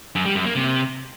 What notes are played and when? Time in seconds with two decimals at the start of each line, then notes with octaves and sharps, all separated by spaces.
0.15 F#2
0.25 G3
0.35 F#2
0.45 A#3
0.55 C3